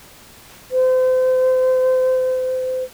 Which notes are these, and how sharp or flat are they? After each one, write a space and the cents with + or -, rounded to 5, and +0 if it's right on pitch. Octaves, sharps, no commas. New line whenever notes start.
C5 -30